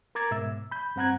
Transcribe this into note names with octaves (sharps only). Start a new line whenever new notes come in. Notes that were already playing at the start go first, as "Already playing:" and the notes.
A#4 A#5 D6 G#6 A6
G#2 B2 E5 E6
B5 G6
G2 C4 F#5 A#5 F#6 G#6